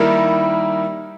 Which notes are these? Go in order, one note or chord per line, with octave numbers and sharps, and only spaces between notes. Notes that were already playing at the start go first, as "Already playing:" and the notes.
Already playing: D#3 G3 A#3 E4 A#4